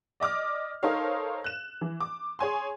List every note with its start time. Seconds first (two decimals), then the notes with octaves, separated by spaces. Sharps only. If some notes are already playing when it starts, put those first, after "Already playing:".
0.20 D5 D#5 D6 F6
0.83 D#4 A4 A#4 C5 C#5 F5
1.44 F#6 E7
1.81 E3
2.00 D6
2.39 G#4 C#5 G#5 C6